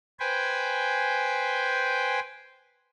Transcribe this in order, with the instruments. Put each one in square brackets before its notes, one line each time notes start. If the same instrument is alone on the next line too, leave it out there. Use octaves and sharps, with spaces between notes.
[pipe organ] B4 C5 G5 G#5